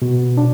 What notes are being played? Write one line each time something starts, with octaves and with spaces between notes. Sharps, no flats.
B2
D4